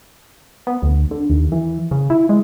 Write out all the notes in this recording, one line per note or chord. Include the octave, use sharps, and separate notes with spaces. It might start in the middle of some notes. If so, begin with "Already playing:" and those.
B3
D2
D3
D#2
E3
C#3
E4
G#3